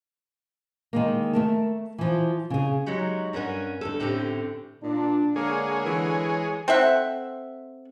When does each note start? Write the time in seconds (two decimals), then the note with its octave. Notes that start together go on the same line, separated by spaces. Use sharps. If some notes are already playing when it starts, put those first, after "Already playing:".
0.93 D#3 G#3 A#3
1.33 A3 A#4 A5
1.98 E3 F3
2.50 C#3 G#4
2.86 F#3 G#3 D#4 F#4 G4
3.33 G2 C#4 A#4 F#5 G#5
3.81 D2 G2 A4
4.00 A2 D3 C4 C#4 F#4 G4
4.83 A#2 D4
5.36 D3 G#3 A#3 G#4 C#5
5.85 E3
6.68 C4 A4 E5 F#5